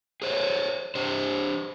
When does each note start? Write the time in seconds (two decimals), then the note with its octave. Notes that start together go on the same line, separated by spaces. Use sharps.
0.22 G#4 C5 C#5
0.95 D4 G4 C5